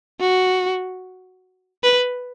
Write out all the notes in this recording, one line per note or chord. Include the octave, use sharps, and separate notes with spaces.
F#4
B4